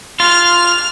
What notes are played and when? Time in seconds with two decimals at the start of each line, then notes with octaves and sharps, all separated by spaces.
0.20 F4 F6